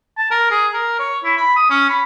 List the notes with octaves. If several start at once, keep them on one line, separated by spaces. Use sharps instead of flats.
A5
A#4
G#4
A#4
C#5
E4
B5
D#6
C#4
B5